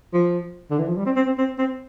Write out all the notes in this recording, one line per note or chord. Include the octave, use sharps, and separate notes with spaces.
F3
D3
E3
F3
G3
C4
C4
C4
C4
C4